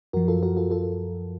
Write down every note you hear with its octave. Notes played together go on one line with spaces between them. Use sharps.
F#2 F3 F#4 A#4
F4 A4
F#4 A#4
F4 A4
F4 A4